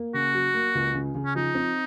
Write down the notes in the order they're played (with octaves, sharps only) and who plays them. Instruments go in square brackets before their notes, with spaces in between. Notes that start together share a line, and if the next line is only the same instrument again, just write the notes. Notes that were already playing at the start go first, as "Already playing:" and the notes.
Already playing: [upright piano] A#3
[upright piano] C#3 [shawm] F#4
[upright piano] F#3
A#3
C#2
C#3
C#3
[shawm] C#4
[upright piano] F3 [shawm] D#4
[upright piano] C4